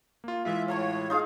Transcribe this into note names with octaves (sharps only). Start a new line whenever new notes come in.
A#3 F4
E3 G#3 F4 E5
A2 C#5 F5 A5 C#6
D#4 F4 G#4 F5